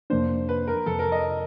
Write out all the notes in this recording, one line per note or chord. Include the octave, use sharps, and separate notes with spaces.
F2 C3 F3 A#3 D4 C5
B4
A#4
F2 C3 F3 A4
A#4
D#5